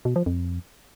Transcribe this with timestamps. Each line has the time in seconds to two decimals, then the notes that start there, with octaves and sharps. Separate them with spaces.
0.05 B2
0.16 F3
0.26 F2